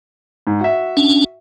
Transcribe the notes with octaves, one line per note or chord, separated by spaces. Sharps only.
G#2
F#4 E5
C#4 D4